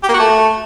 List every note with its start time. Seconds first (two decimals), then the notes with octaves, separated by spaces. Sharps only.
0.03 G4
0.09 A#3
0.14 F#4
0.19 A3